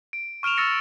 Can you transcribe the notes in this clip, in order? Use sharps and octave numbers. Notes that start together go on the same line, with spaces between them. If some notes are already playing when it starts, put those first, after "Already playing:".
D7
C#6 F6 D7 E7 F7
C#6 E6 A6 A#6 C#7 F7